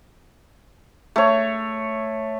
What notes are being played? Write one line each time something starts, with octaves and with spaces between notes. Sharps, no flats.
A3 C#5